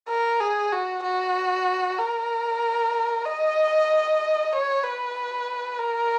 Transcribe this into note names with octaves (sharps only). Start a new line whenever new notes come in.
A#4
G#4
F#4
F#4
A#4
D#5
C#5
B4
A#4